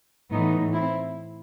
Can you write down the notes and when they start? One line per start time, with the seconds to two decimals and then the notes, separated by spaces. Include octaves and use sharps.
0.31 A2 E3 B3 D#4
0.73 C4 E4